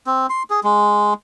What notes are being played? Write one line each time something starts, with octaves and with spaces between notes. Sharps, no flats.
C4
C6
G#4
G#3